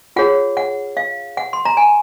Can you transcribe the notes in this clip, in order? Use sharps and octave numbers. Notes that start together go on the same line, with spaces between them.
F4 G#4 C#5 F#5
F#5
F5
F#5
C6
A#5
G#5